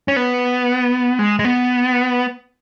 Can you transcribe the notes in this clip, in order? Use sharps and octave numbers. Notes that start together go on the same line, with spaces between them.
C#4
B3
G#3
G#3
B3